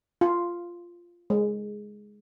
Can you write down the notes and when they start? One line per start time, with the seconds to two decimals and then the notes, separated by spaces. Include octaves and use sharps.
0.21 F4
1.30 G#3